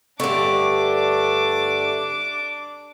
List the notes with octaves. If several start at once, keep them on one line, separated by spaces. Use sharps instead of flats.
G2 D3 A3 D4 D6